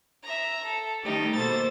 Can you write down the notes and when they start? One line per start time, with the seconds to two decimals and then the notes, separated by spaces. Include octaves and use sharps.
0.23 E5 A#5
0.65 A4
1.03 D#3 G3 A3 D#4 G4
1.35 B2 A#3 A4 C5 A6